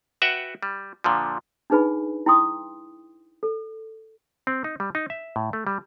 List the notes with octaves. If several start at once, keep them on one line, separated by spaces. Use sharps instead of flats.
F#4 B4 E5 F#5 G5
G3
A#2 D3 F3
D4 D#4 G#4 B4 G#5 B5
E4 G5 C6 D#6
A4
C4
D#4
G3
D#4
E5
A2
A3
G3